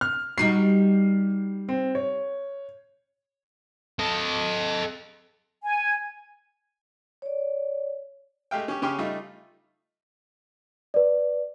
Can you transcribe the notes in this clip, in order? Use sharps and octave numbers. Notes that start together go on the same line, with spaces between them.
F6
G3 D#4 F#4 C7
C4
C#5
A4 D#5
G#5
C#5 D5
G#3 A3 G4 F5 G5
C#4 G4
C#3 C#4 G4 G5 C6 F6
G3 A3 D#4 F4
B4 D5